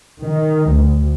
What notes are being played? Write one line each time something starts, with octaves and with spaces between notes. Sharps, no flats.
D#3
D2